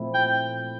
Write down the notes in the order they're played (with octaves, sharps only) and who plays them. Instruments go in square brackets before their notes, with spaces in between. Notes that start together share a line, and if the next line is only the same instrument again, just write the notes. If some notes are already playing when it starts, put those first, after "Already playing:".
Already playing: [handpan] A#2 F3 A3 C4 E4
[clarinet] G5